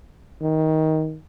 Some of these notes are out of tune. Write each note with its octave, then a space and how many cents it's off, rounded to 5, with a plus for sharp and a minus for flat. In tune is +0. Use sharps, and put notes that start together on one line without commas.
D#3 +15